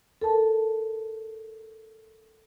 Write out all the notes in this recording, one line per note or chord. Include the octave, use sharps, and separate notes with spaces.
A4 A#4 A5